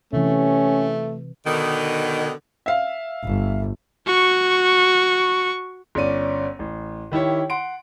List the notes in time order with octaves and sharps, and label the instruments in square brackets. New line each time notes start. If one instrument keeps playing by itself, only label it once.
[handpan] C3 E3 [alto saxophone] A3 [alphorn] C#4
[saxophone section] B2 D3 D#3
[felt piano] E5 F5
[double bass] G1
[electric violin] F#4 C#6
[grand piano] G1 C#4 D5 D#7
A1
D#3 E4 G4 C#5
F#5 C6 D7